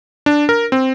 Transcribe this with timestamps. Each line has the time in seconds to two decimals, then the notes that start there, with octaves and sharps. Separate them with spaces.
0.26 D4
0.49 A#4
0.72 C4